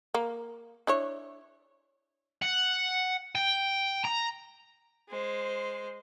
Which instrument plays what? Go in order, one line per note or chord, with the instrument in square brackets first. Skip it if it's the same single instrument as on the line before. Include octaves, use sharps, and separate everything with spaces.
[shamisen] A#3
D4 E4 C#5
[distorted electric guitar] F#5
G5
A#5
[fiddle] G#3 C5